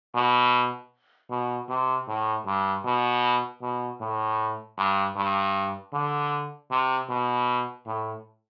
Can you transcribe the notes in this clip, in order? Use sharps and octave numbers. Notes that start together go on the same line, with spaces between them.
B2
B2
C3
A2
G2
B2
B2
A2
G2
G2
D3
C3
B2
A2